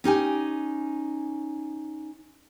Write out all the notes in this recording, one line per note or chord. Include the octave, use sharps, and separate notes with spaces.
C#4 D#4 G4 G#5